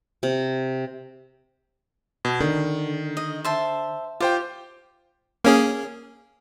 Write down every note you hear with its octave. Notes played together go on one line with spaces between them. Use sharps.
C3
B2
D3 D#3
D#5
C5 E5 A5
F4 G4 C5 G5
A#3 C#4 G#4